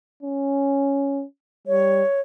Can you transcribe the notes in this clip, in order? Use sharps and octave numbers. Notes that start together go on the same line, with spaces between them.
C#4
G3 C#5